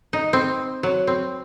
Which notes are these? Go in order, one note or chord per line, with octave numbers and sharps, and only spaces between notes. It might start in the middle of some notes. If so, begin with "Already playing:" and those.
D#4
C4
F#3
C4